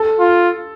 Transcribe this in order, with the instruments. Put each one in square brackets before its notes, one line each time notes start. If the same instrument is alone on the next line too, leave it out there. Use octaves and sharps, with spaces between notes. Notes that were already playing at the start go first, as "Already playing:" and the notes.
Already playing: [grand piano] A4
[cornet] F4